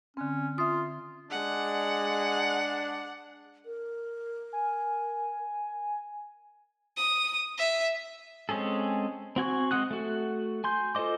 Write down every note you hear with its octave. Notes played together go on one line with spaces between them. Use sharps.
D3 C4 C#4
F4 E5 D#6
G#3 D4 F#5
A#4
G#5
D#6
E5
G#3 C4 C#4 G#4 A4
C4 F#4 G#5 C#6
G#3 C4 F#5 D#6 F#6
A3 F#4
G#5 C6 G6
F4 A4 C5 D#5 D6